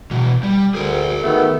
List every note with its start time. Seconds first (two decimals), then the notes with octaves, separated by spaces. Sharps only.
0.11 B2 E3
0.43 G3
0.75 D2 G#4 A#4
1.23 D#3 A3 B3